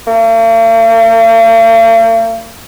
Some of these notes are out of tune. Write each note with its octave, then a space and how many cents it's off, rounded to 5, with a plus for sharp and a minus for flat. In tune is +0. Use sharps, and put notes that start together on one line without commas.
A#3 -45